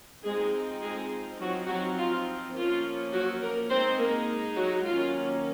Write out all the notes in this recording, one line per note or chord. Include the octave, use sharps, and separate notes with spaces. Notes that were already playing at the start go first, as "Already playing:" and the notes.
F3 G#3 C4 D#4 G#4
G#3 G#4
F3 F#3 C4 D#4 F#4
F#3 F#4
F4
F3 A#3 C#4 F4
F#3 F#4
A#3 A#4
G#3 C4 D#4 C5
A#3 A#4
F#3 F#4
D#3 F#3 A#3 C#4 F4